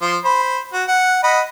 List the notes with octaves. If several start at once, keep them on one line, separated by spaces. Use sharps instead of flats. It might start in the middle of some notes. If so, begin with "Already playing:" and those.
F3 C5
C5 B5
F#4
F#5
D#5 F#5 B5